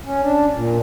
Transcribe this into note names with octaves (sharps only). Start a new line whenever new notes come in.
C#4
D4
A#2